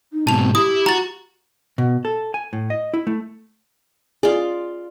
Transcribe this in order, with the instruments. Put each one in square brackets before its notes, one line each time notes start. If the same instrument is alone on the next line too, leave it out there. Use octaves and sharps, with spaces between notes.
[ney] D#4
[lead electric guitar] G#2 B2 [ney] C4 [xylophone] A5 F7
[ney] C4
[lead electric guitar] E4 [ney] G4 [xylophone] D#6
[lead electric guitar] F#4 [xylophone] A#5 A6
[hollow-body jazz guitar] B2
A4
G#5
A2
D#5
E4
A3
[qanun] F4 D5 [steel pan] G#4